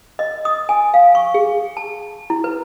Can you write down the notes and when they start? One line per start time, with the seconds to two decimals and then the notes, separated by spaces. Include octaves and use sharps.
0.19 D#5
0.45 D#6
0.69 G#5
0.94 F5
1.15 C#6
1.34 G#4
1.77 A5
2.30 E4
2.44 B4